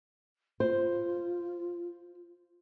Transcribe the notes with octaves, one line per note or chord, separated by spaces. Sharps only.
F4 C5